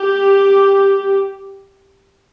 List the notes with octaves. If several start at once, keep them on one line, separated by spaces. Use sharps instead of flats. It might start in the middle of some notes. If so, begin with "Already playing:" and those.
Already playing: G4